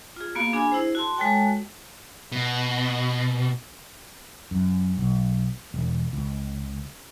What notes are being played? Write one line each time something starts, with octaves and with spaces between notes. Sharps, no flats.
F4 G#4
A#3 B3 F#4 F5
D4 G#4 G#5 B5
E4 G#4 C5
F#4 A5 C6
G#3 F#4 A4 C#5 G5 A5
B2
F#2
B1
E1
C#2